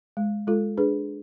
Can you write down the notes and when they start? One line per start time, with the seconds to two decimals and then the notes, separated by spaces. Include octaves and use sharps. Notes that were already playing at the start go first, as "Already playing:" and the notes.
0.17 G#3
0.47 G#3 F4 A4
0.77 D4 G#4 B4